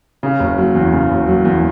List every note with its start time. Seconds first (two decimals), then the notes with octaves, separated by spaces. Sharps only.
0.23 C#3
0.40 F#1
0.57 F#3
0.75 E2
0.92 C#3
1.11 F#1
1.27 F#3
1.45 E2